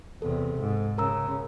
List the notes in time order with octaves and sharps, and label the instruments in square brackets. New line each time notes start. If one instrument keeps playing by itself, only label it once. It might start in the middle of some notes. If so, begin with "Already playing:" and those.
[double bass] E2 C3 [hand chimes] A4
[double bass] G#2
[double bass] C#3 [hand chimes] A#4 A#5 E6